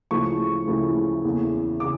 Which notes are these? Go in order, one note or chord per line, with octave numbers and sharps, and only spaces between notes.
D2 C#3 F3 A3 E4 C#6
D2 C#3 F3 A3 E4
E2 C#3 E3 A#3
C#3 D6